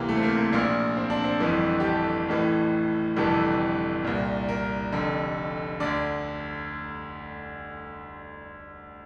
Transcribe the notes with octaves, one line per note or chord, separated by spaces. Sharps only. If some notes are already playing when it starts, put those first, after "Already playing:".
Already playing: D2 C3 E3 A#3
A3
C4
A#3
A#3
A#1 A#2 A#3
C4
D4
C4
G1 F2 E3
G4
A4
A1 A2 E3
G1 F2 C3 E3 A4
C2 A#2
A#4
F1 F2 D3
D2 D3 D5